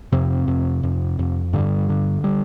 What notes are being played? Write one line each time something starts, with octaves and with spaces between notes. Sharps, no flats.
F2 C3 C4
F2
F2
F2
G2 D3 G3
D3
G3